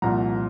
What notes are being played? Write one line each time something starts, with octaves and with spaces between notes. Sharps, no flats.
C2 A#2 F3 F#5 A#5